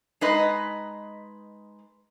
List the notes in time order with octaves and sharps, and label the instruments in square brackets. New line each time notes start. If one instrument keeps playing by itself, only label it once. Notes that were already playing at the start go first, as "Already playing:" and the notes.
[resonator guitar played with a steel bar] G#3 D#4 B4 D#5